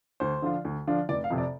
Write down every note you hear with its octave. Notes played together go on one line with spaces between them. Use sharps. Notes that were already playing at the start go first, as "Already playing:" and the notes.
D2 C5
D3 F3 D4 F4
D2
D3 F3 D4 F4
F1 D5
F5
F2 C3
D5